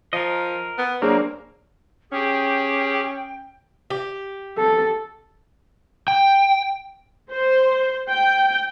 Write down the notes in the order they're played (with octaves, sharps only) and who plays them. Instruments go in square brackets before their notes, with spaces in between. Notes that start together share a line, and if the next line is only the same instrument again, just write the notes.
[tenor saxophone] F3 [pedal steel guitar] A#4 D#5
[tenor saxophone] B3
[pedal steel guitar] F#3 [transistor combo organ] A#3 [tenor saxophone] C4 [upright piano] D4 G#4 C#5
[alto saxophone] C#4 [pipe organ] G4 G#4 [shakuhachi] G5
[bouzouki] G4
[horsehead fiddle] A4
[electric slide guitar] G5
[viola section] C5
G5